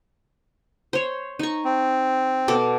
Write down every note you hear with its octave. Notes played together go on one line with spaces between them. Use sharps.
C5 C#5
D#4 C#6
C4
B2 A4 D6